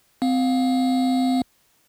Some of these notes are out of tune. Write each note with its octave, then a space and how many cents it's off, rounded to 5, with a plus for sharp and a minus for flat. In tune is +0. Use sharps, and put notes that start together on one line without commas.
C4 -25 F5 +20